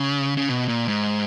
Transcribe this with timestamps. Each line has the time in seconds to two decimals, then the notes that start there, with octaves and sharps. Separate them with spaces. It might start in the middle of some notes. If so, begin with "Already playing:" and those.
Already playing: C#3
0.37 C#3
0.49 B2
0.68 A#2
0.88 G#2